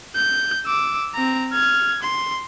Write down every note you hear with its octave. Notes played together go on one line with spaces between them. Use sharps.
G6
D6 E6
C4 A#5
F6 G#6
C6